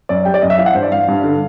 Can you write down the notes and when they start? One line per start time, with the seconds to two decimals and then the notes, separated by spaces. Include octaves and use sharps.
0.09 F#2 D5
0.25 G3 G5
0.34 D5
0.42 F#2 D#5
0.50 E5
0.58 E3 F5
0.66 F#5
0.74 G2 C5
0.83 D5
0.91 G2 F5
1.08 G2
1.23 D3